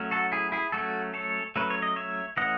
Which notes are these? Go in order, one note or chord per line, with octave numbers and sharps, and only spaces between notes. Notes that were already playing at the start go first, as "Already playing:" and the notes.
Already playing: F#3 A3 C#4
F#4 A4
E4 G#4
E4 G#4
F#3 A3 C#4 F#4 A4
A4 C#5
F#3 A3 C#4 B4
C#5
D#5
C#5 E5
E3 A3 C#4 D#5 F#5